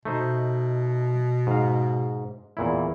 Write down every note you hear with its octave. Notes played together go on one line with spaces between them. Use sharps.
B2 A3 D#4 C5
G#2 F5
E2 A#2 E4